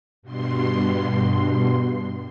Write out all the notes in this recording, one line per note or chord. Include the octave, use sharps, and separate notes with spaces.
G2 B2 C6